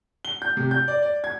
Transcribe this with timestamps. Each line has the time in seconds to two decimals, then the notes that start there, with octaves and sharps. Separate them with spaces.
0.25 G7
0.42 G6
0.57 C3
0.71 G6
0.88 D5
1.02 D5
1.24 G#6